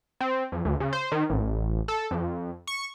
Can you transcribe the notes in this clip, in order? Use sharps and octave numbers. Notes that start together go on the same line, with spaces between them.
C4
F2
D2
C#3
C5
D#3
A1
A4
F2
C#6